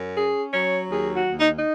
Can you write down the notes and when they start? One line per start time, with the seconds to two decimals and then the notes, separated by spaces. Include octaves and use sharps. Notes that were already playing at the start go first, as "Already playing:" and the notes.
Already playing: F#2
0.16 C#4 G#4
0.53 F#3 C#5
0.91 D#2 G#4
1.15 F#4
1.27 D#2
1.40 D#4
1.58 D#4